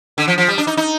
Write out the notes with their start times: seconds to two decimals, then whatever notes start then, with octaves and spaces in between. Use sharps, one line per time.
0.18 D3
0.28 F3
0.38 F3
0.48 G3
0.58 D4
0.67 D#4
0.77 D#4